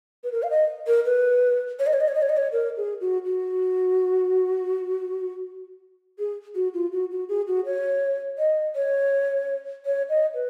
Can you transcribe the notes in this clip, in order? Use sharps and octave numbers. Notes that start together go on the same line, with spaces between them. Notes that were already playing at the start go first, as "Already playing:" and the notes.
B4
A#4
F5
D#5
A#4
B4
C#5
D#5
C#5
D#5
C#5
D#5
C#5
D#5
C#5
A#4
G#4
F#4
F#4
G#4
F#4
F4
F#4
F#4
G#4
F#4
C#5
D#5
C#5
C#5
D#5
B4